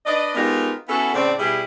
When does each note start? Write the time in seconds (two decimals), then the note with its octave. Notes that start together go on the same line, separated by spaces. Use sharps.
0.06 D4 B4 D5 D#5
0.35 G#3 B3 D#4 F4 G4 A#4
0.88 B3 C#4 E4 F#4 A4
1.14 A2 C#3 C4 D5
1.39 B2 G3 E4 G4 G#4